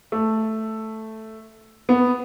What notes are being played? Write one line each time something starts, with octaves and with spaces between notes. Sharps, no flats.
A3
B3